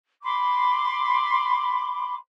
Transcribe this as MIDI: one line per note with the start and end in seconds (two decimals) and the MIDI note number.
0.23 2.14 83
0.23 2.14 84
0.23 2.14 86